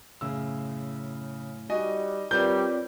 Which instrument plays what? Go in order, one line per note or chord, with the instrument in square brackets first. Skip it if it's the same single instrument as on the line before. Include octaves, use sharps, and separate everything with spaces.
[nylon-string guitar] F#2 A2 [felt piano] C#3 E6
[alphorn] G3 [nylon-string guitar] D#4 G#5 [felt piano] F#4 [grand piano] D#5
[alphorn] G3 [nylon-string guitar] C4 F4 D5 [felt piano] A#4 B4 C#5 [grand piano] G6